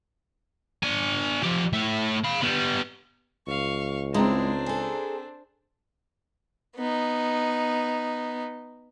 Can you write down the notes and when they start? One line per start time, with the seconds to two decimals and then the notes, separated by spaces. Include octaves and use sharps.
0.83 D4 G#5
1.43 F3 G4
1.73 A2 E5
2.24 F5 B5
2.42 G3 B3
3.48 C#2 F5 C#6
4.14 G2 G#3 C4 D4 E4 C5 A#5
4.66 G#4 A4
6.76 B3 D#4